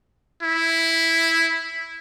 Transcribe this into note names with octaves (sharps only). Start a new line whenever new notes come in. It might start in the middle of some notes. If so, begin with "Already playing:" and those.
E4